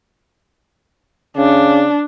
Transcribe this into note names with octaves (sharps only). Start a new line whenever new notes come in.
C#3 D4